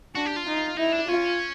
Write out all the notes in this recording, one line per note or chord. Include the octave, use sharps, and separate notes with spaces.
D4 F#4
G4
F4
D#4
D#4 E4
D4
C#4 F4